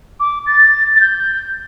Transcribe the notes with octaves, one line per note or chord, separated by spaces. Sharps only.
D6
A6
A6
G6